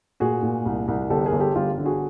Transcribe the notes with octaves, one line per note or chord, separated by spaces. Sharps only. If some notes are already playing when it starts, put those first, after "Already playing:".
A#2 F#4 G#4
A#2
C2
C2
G1 G4 A4
G#4 A#4
G1
G4 A4
G1 F4 G4
D3
F#4 G#4